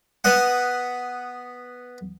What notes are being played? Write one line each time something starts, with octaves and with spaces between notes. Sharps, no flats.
B3 D#5 F#5